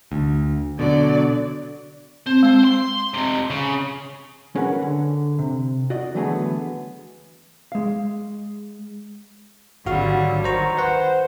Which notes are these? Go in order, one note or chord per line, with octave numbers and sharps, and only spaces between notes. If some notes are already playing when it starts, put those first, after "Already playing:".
D2
B2 D3 F#3 D5
C4 C5
G#3 C4
C6
F2 C3
C#3
C#4 G#4 A#4 B4 F#5 G#5
D3
C3
F#4 D5 D#5
D3 E3 F#3 A3 B3 G#4
G#3 F5
G#1 D3 F#3 G3 F#4 F5
D#3 F#3 C5 A#5 C#6
B4 C5 F#5